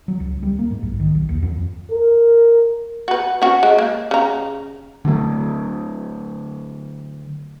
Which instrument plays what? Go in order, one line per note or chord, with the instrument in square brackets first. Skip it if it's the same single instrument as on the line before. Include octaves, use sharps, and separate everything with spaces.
[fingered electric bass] F#3
C#2
G3
A#3
G#2
B1
D#3
B1
D#2
F2
[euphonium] A#4
[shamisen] F#4 B4
C#4 F#4
G#3
A#3
C#3 A#5
[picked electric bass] D3 F#3 A3